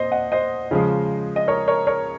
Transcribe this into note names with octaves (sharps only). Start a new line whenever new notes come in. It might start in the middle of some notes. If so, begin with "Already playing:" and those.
Already playing: A#2 C5 D#5
D#5 F#5
C5 D#5
C#3 F3 G#3
D#5
A#4 C#5
A#4 C#5
A#4 C#5